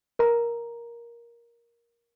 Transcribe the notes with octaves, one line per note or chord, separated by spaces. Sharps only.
A#4 A#5